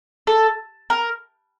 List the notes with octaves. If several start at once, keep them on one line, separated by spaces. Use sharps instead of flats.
A4
A#4